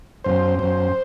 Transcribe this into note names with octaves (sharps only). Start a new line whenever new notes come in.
F#2 C5
F#2 C5